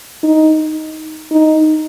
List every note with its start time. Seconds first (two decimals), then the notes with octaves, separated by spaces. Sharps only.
0.23 D#4
1.31 D#4